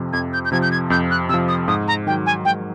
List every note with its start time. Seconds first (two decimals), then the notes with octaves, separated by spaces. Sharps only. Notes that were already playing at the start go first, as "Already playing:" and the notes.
Already playing: F2 C3 F3
0.13 F2 G#6
0.33 G6
0.45 G6
0.52 C3 F3 G#6
0.62 G6
0.72 G#6
0.90 F2 G6
1.11 F#6
1.29 C3 F3 E6
1.48 D#6
1.68 G#2 D#6
1.88 A#5
2.07 D#3 G5
2.10 F#3
2.26 G#5
2.45 G#2 G5